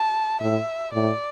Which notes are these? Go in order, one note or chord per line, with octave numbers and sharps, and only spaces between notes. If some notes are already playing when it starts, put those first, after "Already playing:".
Already playing: A5
A2 E5
A2 D5